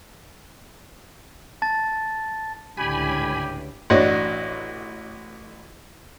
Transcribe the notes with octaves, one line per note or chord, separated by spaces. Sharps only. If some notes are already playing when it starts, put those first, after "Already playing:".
A5 A6
C#2 A2 D3 G4 G#5 B5
A1 D4 F#4 C#5 D#5